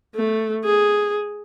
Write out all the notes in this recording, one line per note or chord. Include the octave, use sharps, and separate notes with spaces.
A3
G#4